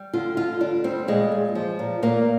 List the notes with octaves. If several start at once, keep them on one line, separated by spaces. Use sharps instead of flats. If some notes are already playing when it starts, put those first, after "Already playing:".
Already playing: G3
D3 F4
D3 F4
G3 D4
G3 C4
A#2 G#3
G#3
F3
A#2
A#2 A#3